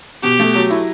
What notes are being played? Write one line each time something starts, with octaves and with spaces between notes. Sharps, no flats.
B2 G4
A3
F#3
E4